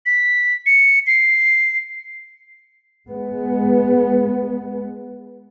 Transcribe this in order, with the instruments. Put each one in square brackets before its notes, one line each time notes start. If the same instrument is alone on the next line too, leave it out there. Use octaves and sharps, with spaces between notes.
[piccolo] B6
C#7
C7
[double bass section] G#3 B3